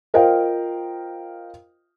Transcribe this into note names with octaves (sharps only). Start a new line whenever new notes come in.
F4 A#4 C5 D#5 F5 G5